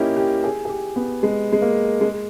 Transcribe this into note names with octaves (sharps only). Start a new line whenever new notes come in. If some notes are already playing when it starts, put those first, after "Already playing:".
Already playing: A#3 C#4 D#4 E4 G4
G4
G#4
G#4
G4
B3
G#3
G#3
A#3
G#3